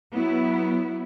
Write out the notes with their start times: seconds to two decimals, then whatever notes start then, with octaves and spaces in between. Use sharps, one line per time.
0.13 F#3 B3 E4